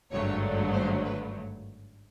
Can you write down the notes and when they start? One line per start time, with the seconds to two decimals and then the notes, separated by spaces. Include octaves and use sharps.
0.11 G#1 G2 D3 F#3 A3 C#5
0.73 C5
1.04 B4